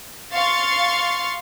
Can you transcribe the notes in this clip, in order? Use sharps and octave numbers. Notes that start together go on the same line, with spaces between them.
F5 C6 C#6 A6